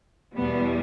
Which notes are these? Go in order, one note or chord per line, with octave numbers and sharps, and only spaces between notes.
E2 B2 G3 B3